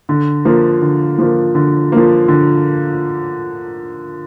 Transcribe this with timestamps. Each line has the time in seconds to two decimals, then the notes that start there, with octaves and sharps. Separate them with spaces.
0.09 D3
0.45 F3 A#3
0.82 D3
1.18 F3 A#3
1.55 D3
1.92 F3 A#3
2.28 D3